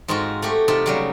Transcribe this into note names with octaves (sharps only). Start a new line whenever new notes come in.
G#2 C4 D#4 F4 F#4
A3 F#4 G4
C3 D#4 F4 G4 E5 A5
C#3 F#3 G3